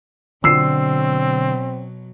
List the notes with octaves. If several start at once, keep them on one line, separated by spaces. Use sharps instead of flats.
B2 D3 F#3 C4 E6 C7